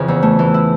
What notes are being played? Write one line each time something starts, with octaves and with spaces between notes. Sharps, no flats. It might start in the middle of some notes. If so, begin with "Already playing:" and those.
Already playing: F2 C#3 E3
E2
A3
E3
E4